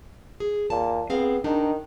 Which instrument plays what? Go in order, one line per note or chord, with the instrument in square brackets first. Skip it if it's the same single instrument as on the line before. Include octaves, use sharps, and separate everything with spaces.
[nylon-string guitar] G#4
[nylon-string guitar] D#2 A5 [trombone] A#2
[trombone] B3 [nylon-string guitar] C4 G#4 F5
[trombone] D#3 [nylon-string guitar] D4 D#4